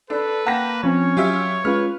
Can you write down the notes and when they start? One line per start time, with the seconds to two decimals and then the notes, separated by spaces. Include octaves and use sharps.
0.10 D4 A4 B4
0.46 A#3 F#5 G5 A5 A#6
0.84 F3 C4 C#4 C#5
1.17 F#3 F4 G4 E5
1.65 G#3 C#4 F4 B4 F6